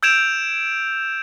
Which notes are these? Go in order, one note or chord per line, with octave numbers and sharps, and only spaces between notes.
E6 G6 G#6 D7 E7 F7